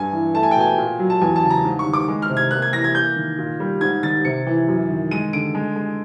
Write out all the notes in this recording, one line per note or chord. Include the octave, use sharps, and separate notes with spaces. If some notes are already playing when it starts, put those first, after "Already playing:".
Already playing: G2 G#5
E3
A3 A5
G#5
G5
B2 G#5
A#2
F#3
A5
E2 G#5
A5
C#3
A#5
G#2
C#6
D#3
D6
G#3
F6
C3
G#6
A#3 F#6
G#6
E3 A#6
G#6
A#3 G6
D#3
A#2
G3
G#2 G#6
D#3 A6
C3 C#7
E3
F#2
D#3
G#3 D#7
D3 D7
G#3
G#3